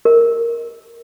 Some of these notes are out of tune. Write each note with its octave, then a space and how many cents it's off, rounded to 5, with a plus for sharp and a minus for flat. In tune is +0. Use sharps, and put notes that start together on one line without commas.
A#4 -5